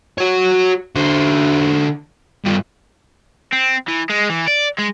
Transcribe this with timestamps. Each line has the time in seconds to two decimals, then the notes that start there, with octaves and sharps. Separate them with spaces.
0.18 F#4 C#5
0.96 D3 C5
2.45 G2 F4
3.53 C4
3.88 E3
4.10 G#3
4.30 E3
4.48 D5
4.78 G#3